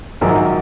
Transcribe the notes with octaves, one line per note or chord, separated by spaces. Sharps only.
A#1 G#2 D#3 F#3 A#4